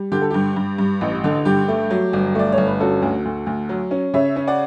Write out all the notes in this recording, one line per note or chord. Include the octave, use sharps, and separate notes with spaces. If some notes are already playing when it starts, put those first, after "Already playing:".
Already playing: G3
D3 G4
A4
G2 G4
G2
G2
A1
D3
G2 G4
A3
F#3
G1
A3 D5
C#5
G1
B4
C#4 F#4 A4
D2
D2
D2
F#3
C#4
C#3 C#5 E5
C#4
D5 F#5